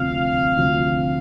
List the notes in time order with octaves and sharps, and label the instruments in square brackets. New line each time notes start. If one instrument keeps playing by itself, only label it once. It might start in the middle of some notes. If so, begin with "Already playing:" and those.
Already playing: [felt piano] D2 C3 F3 [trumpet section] F5
[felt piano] D2 C3 F3